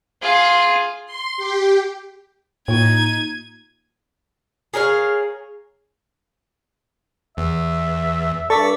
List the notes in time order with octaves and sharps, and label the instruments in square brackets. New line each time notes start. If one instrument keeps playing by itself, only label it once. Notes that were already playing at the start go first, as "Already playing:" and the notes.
[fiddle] F4 G#4
[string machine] C6
G4
[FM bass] A2 [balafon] A#3 F4 [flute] D#4 [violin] G#6 D#7
[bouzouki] G#4 A#4 C#5 F5
[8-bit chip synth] E2 [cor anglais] E5
[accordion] G2 D5 [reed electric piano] A4 [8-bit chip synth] C#6 A6 B6